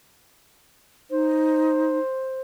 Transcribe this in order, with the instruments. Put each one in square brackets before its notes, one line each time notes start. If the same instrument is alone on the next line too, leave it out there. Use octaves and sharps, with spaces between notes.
[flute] D#4 [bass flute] C5